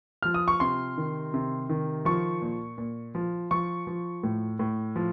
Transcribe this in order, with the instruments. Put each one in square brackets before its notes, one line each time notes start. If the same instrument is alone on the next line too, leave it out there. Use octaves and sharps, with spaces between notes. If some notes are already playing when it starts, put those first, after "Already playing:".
[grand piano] F3 F6
D#6
C#6
C3 C6
D#3
C3
D#3
F3 C#6
A#2
A#2
F3
F3 C#6
F3
A2
A2
F3